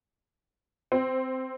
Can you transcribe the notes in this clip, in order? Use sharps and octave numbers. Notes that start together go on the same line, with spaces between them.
C4